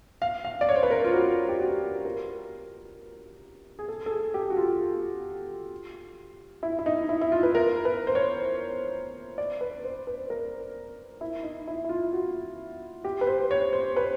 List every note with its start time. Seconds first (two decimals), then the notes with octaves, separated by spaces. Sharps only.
0.22 F5
0.45 F5
0.61 D5
0.69 C#5
0.76 C5
0.83 B4
0.91 A#4
1.05 F4
1.13 F#4
1.49 G4
1.59 F#4
2.05 A#4
3.79 G#4
3.88 A4
4.06 A4
4.11 G#4
4.34 G4
4.50 F#4
4.57 F4
6.63 E4
6.79 E4
6.86 D#4
7.09 E4
7.21 E4
7.32 F4
7.43 B4
7.55 A#4
7.85 B4
8.07 C5
8.15 C#5
9.38 D5
9.61 B4
9.84 C5
10.07 B4
10.30 A#4
11.21 E4
11.43 D#4
11.67 E4
11.84 E4
11.89 F4
12.13 F#4
13.04 G4
13.21 B4
13.27 C5
13.51 C#5
13.73 C5
13.97 B4